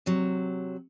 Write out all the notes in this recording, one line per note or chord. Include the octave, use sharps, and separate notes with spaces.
C3 F#3